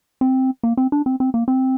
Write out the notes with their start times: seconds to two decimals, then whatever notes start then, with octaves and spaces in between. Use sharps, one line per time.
0.21 C4
0.63 A#3
0.77 C4
0.92 D4
1.06 C4
1.20 C4
1.34 A#3
1.48 C4